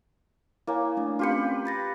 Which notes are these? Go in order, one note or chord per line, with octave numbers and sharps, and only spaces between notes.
A#3 E4 C#5 G#5
A3 D4
C4 C#4 F4 G4 B4 C#7
B5 A6 A#6